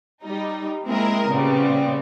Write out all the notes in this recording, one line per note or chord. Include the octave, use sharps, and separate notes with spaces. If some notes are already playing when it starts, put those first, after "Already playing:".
G3 D#4
G#3 A#3 C4 E4 G#4 A#4
A#2 C#3 G3 B3 C4